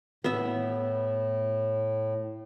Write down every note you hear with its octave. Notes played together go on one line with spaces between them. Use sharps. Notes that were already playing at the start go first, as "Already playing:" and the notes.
A2 B3 E5